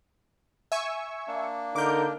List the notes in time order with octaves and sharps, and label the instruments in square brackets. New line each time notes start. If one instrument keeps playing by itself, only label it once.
[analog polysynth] E5 G#5 C#6
[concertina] A#3 D4
[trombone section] D3 D#4 A#4 [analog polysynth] D6 G6